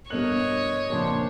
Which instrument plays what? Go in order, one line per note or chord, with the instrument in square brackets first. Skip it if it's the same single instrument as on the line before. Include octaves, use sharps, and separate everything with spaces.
[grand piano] G2 B2 F#7 [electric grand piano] A4 A#4 F#6 [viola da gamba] C#5 [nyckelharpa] D#5
[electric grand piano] F2 C#3 F3 [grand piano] A#2 [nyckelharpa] D4 C5